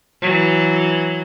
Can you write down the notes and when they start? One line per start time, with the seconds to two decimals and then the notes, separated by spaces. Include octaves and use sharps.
0.22 E3 F#3